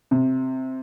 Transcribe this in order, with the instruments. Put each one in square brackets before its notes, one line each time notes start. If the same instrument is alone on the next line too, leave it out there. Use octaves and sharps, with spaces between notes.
[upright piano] C3